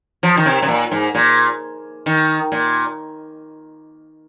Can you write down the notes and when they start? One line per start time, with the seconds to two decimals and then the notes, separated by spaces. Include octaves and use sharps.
0.23 F3
0.37 D#3
0.46 C3
0.62 C3
0.68 A#2
0.92 G#2
1.15 A#2
2.06 D#3
2.52 A#2